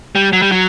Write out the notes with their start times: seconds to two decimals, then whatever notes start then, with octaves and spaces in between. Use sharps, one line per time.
0.15 G3
0.33 F#3
0.42 G3
0.52 F#3